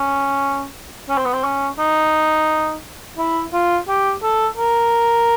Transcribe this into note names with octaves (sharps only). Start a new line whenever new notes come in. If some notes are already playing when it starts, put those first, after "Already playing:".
Already playing: C#4
C#4
C4
B3
C4
C#4
D#4
E4
F4
G4
A4
A#4